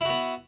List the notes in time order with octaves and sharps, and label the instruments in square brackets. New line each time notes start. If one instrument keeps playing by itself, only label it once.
[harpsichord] E4
F#4
B3